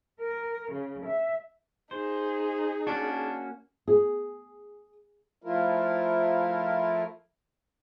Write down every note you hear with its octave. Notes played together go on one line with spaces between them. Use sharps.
A#4
C#3
E5
D#4 G#4 C5
A#3 C#4 D4 F#4
G#4
F3 A3 E4 F4 A#4